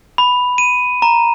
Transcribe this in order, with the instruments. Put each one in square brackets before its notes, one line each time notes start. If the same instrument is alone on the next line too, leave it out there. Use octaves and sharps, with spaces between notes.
[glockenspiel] B5
D#7
A#5